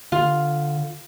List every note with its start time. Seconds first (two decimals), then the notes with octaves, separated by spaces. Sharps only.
0.12 D3 F4